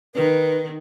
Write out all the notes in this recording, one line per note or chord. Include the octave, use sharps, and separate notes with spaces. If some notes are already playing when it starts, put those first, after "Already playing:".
D#3 B4